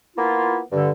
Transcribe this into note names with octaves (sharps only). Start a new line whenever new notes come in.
A#3 B3 E4 F4
G2 D3